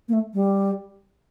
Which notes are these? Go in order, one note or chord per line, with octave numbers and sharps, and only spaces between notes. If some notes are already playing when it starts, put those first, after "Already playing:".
A#3
A3
G3